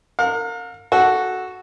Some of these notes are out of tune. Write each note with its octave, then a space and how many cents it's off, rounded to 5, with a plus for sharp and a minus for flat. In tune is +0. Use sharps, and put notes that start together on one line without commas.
A#4 -30 F5 +40
F#4 +0 A4 -10